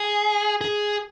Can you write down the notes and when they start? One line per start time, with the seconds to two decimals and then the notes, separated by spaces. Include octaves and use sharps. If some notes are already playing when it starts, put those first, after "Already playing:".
Already playing: G#4
0.61 G#4